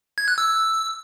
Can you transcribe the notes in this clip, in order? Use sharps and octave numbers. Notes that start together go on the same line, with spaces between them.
G#6
F#6
E6